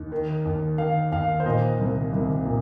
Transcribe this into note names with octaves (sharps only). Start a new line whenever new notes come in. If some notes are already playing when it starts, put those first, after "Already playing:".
Already playing: D#2
D#3
D#2
D#3 F5
D#2 F5
C5
A#2 D#5
C2
C2
A#2